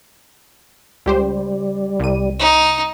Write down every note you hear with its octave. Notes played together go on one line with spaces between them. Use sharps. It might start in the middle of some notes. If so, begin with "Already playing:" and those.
C#2 G3 G4 C5
C2 D#7
D#4